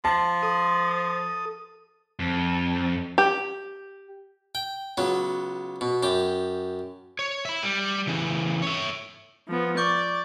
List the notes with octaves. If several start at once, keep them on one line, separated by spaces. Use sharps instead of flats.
F3 A5
A4 D#6
F2
G4
G5
C#2 F#3 B3
B2
F#2 G4
C#5
E5 B5
G3
C#3 E3
C#5 E5
F3 B3
D5 C#6 D6 G6